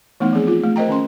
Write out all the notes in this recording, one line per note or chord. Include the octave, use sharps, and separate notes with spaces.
E3 A3 B3 D#4
F3 C4 G#4
F4
A3
A#4 C5 D#5 G5 A#5
D#3 C#4 C6